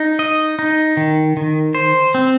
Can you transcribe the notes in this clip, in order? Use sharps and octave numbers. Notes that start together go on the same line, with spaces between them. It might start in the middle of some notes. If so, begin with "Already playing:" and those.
Already playing: D#4
D#5
D#4
D#3
D#3
C5
C4